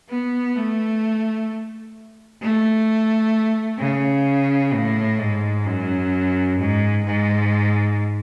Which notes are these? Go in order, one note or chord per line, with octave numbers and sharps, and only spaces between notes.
B3
A3
A3
C#3
A2
G#2
F#2
G#2
G#2